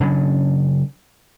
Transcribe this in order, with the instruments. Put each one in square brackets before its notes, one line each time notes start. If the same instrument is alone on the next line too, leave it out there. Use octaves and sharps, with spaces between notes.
[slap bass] C#3 F#3 C#4 D4